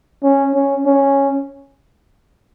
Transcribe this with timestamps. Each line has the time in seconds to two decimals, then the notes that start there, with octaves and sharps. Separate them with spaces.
0.23 C#4
0.54 C#4
0.86 C#4